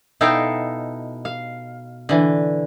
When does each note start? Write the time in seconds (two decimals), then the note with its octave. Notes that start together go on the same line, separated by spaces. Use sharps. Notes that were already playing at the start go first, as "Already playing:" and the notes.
0.21 B2 D#4 E4 A4 F5 G5
1.25 F5
2.09 D3 E3